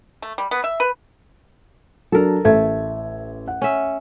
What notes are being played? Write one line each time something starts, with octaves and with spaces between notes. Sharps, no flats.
A3
G3
B3
E5
B4
F#3 D4 A4 A#4
A1 A3 E5 G#6
F#5
C#4 E5